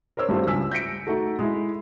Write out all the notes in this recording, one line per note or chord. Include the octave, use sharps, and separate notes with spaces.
A#4 C5 C#5 E6
G2 G3 A3 C4 F4 F#4
C#2 G2 G#5 E6 B6
G6 A#6 B6 C#7 D7
A3 D#4 F#4 A4
G#3 E4